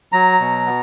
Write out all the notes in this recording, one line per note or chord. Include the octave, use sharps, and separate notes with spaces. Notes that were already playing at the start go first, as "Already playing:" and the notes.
F#3 A#5
B2
B3